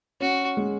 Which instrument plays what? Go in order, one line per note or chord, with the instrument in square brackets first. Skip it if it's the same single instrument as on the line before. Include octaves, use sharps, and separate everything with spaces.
[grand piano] C#4 [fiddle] F#4
[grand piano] G#3